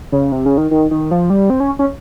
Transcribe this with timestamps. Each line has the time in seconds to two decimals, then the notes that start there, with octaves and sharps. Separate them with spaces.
0.12 C#3
0.32 C3
0.46 C#3
0.58 D#3
0.71 D#3
0.91 D#3
1.11 F3
1.30 G3
1.50 C4
1.60 C#4
1.79 C#4